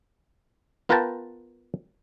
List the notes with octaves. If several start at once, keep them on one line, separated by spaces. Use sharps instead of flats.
B3 F4 A#4 B4 G5 A5